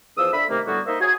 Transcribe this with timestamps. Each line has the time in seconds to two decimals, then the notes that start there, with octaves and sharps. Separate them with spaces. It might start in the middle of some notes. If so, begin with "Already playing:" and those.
0.17 E2 F3 D#6 E6
0.33 D3 E5 B5
0.49 C3 D#3 A3 A#3
0.67 A2 D3 G3 A#3 B3 F#4
0.87 A#3 D#4 C5 D#5 E5
1.00 F#4 G#4